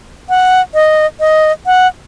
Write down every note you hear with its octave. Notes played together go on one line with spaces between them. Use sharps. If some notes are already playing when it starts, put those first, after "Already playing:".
F#5
D#5
D#5
F#5